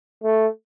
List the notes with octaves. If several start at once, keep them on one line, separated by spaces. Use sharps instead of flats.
A3